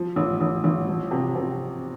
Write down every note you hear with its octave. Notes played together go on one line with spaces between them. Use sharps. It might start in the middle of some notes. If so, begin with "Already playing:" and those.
Already playing: F3
A1
A1
A1
F3
C3
C3